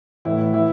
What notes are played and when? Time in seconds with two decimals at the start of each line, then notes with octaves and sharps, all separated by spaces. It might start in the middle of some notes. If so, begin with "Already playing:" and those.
0.25 A2 E3 E4
0.39 E4
0.53 E3 E4